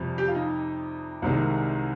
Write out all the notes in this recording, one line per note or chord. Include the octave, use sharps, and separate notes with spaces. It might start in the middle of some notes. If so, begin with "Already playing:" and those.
Already playing: F2 C3 G3
G4
F4
D#4
C2 C3 D#3 G#3